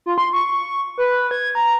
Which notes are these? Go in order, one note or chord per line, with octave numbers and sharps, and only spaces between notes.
F4
C6
C#6
B4
G#6
A#5